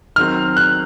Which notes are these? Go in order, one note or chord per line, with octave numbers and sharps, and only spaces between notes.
D#3 F#3 C4 F6
F#6